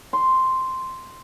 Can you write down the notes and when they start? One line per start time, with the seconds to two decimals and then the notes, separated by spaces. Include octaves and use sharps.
0.13 C6